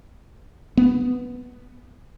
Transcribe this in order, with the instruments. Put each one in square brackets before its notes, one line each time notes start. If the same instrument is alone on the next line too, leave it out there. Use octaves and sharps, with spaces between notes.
[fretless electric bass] B3